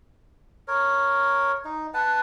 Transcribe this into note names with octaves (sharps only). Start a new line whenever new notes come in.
A#4 C#5
D#4
B4 F#5 A5